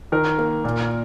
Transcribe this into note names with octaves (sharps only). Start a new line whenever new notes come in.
D#3 A#4
A#3
A#2